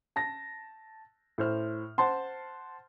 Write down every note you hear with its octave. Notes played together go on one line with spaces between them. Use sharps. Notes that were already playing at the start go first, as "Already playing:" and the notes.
A5 A#6
A2 C5 F6
C5 F#5 A5 C6